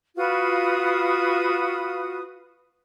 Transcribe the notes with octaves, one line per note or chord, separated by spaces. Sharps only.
F4 F#4 B4 D#6